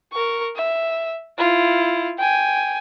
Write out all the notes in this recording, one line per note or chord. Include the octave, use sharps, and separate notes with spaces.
A#4 C#6
E5
E4 F4
G5 G#5